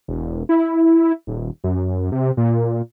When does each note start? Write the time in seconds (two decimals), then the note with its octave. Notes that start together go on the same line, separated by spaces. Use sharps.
0.08 E1
0.49 E4
1.27 D#1
1.64 F#2
2.12 C3
2.37 A#2